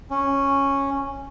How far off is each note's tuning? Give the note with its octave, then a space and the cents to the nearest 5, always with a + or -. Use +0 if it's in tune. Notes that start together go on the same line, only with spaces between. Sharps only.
C#4 -5